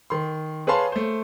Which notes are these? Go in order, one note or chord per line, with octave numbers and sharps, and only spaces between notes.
D#3 C6
G#4 B4 C#5 F5 A5 C6
A3 C5